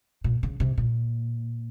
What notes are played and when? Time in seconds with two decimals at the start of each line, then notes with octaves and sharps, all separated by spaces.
0.24 A#2
0.43 C#3
0.60 C3
0.78 A#2